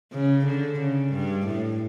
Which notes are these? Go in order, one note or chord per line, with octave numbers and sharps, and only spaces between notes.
C#3
D3
C#3
G2
A2